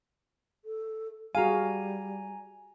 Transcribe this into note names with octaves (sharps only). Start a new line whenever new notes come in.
A4
G3 F#4 G#4 F5 G#5 A#5